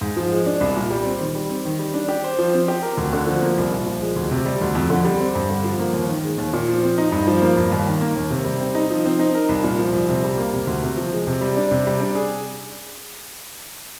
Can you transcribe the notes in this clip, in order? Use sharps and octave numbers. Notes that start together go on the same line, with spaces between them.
G#2
F3
G#3
D4
C2
A#2
G3
C4
D#3
G3
C4
D#3
G3
D4
G4
C5
F3
C4
G4
A#4
D2
D3
F3
A#3
C2
A#2
F3
G#3
D2
C3
G3
D2
F2
D3
G3
C4
G2
D3
F3
A#3
D#2
D#3
G#3
D#2
A#2
F3
C4
D#4
G2
F3
A#3
G2
D#2
D#3
A#3
D#2
C3
G3
C4
D#4
F3
C4
D#4
A#4
C2
A#2
F3
C2
C3
G3
A#3
C3
D2
C3
F3
G#3
C3
G3
D4
C3
G3
D4
G#4